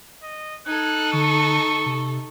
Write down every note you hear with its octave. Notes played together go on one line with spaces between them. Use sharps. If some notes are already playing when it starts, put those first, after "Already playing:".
D#5
D#4 A4 F#6 G#6
D3 C#6
C3